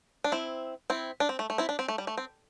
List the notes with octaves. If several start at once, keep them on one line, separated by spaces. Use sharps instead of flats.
D4
C4 E4
C4 E4
D4
C4
A3
A3
C4 E4
D4
C4
A3
G3
A3
C4